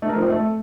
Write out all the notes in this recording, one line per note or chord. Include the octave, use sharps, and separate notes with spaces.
A3
A#4
F3
C4
A3